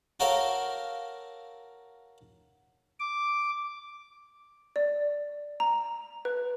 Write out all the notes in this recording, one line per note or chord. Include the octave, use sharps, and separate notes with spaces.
F#4 A4 A#4 C#5 F5 G5
D6
D5
A#5
B4